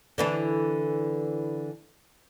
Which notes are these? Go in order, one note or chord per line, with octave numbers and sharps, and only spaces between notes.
D3 E3 D4